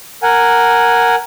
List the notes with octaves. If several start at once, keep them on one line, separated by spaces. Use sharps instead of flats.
A#4 F#5 G#5